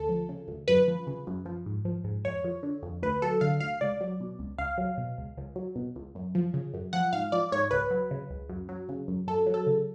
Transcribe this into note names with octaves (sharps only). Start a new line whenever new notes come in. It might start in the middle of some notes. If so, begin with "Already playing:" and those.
Already playing: D2 A4
F3
C#3
D2
F#2 B4
F3
C#3
F#2
F3
G#2
F3
G#2
F2 C#5
F3
D3
F2
D2 B4
F#3 A4
D3 F5
D2 F5
C#2 D5
F#3
B2
C#2
C#2 F5
F#3
B2
C#2
C#2
F#3
B2
C#2
F#2
F3
C#3
F#2
F3 F#5
G#2 F5
F3 D5
G#2 C#5
C#2 B4
F#3
C#3
C#2
F#2
F#3
C#3
F#2
F#2 A4
F#3
A4
C#3